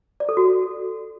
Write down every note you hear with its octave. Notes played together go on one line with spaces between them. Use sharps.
D5
A4
F#4